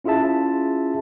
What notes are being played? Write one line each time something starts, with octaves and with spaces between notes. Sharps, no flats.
C#4 E4 F4 G#4 E5 A5